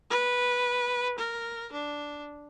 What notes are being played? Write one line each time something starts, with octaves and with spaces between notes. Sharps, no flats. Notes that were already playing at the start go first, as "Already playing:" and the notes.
B4
A#4
D4